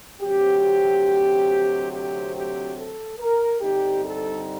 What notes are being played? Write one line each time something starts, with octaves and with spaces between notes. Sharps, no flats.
D2 C3 F#3 C4 G4
G4
G4
A4
A#4
G2 D3 G3 C4 D#4 G4
A4